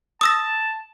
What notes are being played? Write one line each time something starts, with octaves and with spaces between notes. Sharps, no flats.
A5 D#6 E6 A#6